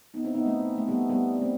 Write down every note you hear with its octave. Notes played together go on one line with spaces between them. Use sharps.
B3 D#4
C4 E4
B3 D#4
A3 C4
A3
G3 B3
G3 B3
B3
A3 C4